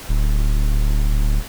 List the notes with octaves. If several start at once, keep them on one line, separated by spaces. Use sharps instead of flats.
D1